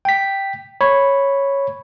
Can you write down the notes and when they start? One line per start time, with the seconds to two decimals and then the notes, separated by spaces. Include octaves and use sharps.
0.05 G5 B6
0.81 C#5 B5